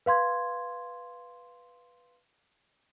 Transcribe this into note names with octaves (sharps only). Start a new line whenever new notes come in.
B4 F5 C6 G#6